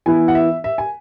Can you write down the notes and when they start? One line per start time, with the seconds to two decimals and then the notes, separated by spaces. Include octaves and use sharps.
0.06 E3 B3 E4 G#5
0.28 F#5
0.35 E5
0.64 E5
0.78 G#5